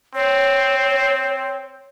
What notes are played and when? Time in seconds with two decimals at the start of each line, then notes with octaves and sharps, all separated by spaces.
0.15 C4 C#5